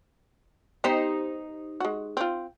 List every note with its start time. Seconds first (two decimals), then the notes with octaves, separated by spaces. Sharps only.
0.84 B3 D#4 G4 C5 G5
1.80 G#3 F#4
2.17 C4 F4